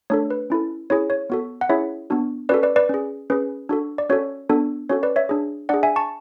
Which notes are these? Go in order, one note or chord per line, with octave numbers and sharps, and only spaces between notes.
A3 D4 A4 C#5
B4
C#4 E4 A4
C#4 E4 G#4 C#5
C#5
B3 F#4 A4
F#5
C#4 E4 G#4 C#5 E5
B3 D4 F#4
C#4 F#4 A4 B4 D5
B4 D5
B4 D5
C#4 G#4
C#4 G#4 B4
D4 F#4 A4
D5
C#4 F#4 A4 C#5
B3 D4 F#4 A4
C#4 F#4 A4 C#5
B4 D5
C#5 E5
D4 G#4
D4 G#4 D5 F#5
E5 G#5
A5 C#6